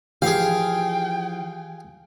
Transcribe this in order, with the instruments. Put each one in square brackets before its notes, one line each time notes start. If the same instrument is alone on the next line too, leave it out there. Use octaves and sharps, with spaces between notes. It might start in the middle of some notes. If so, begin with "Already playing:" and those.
[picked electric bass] E3 F3 [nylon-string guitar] G4 [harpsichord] G#4 F5 [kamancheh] G5